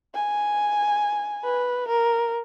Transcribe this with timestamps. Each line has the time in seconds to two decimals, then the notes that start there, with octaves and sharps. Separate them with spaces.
0.15 G#5
1.44 B4
1.88 A#4